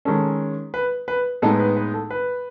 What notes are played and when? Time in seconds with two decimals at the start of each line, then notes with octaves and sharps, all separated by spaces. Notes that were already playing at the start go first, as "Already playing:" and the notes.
0.05 D#3 G#3 C#4 A4
0.74 B4
1.08 B4
1.42 A2 G#3 B3 D#4 A4
1.60 B4
1.76 B4
1.94 A4
2.10 B4